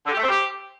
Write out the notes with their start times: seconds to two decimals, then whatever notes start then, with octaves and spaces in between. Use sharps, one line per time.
0.05 D3
0.11 G4
0.17 A3
0.23 C4
0.28 G4